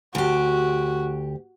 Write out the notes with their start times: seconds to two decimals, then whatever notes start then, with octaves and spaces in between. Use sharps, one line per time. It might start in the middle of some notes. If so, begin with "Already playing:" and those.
0.15 D2 F#4 G4